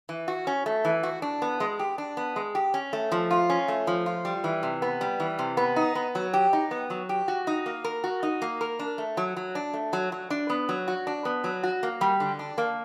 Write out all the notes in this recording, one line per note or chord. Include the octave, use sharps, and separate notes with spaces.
E3
F#4
C#4
A3
E3
F#4
D4
B3
G#3
G4
D4
B3
G#3
G4
C#4
A3
F3
F4
C#4
A3
F3
F4
G3
E3
C3
B3
G3
E3
C3
B3
D#4
B3
F#3
G4
D#4
B3
F#3
G4
F#4
D#4
A#3
A#4
F#4
D#4
A#3
A#4
D4
A3
F#3
F#3
D4
A3
F#3
F#3
D4
B3
F#3
F#4
D4
B3
F#3
F#4
A#3
G3
D3
D4
A#3